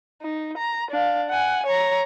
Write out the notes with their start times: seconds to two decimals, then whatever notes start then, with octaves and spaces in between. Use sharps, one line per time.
0.22 D#4
0.58 A#5
0.91 D4 F5
1.30 F#5 G#5
1.66 C#5 A#5